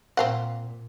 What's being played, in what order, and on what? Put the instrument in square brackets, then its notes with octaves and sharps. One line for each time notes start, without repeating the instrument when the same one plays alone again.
[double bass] A#2 [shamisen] C4 F5 F#5